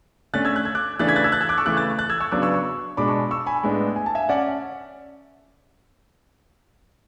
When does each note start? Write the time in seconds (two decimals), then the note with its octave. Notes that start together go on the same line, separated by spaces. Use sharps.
0.34 D3 A3 C#4 F#6 A6
0.45 E6 G#6
0.56 F#6
0.65 G#6
0.75 D6 F#6
0.99 C#3 E3 A3 D4 F#6 A6
1.08 G#6 B6
1.16 F#6 A6
1.24 E6 G#6
1.32 F#6 A6
1.41 E6 G#6
1.49 D6 F#6
1.58 C#6 E6
1.65 C#3 E3 A3 D6 F#6
1.77 F#6 A6
1.98 F#6 A6
2.10 E6 G#6
2.20 C#6 E6
2.32 C#3 F#3 B3 D4 D6 F#6
2.42 C#6 E6
2.54 C#6 E6
2.97 B2 G#3 D4 B5 D6
3.08 A5 C#6
3.31 C#6 E6
3.46 G#5 B5
3.63 A2 G#3 B3 D4
3.96 G#5
4.06 A5
4.15 E5 G#5
4.29 C#4 D5 F#5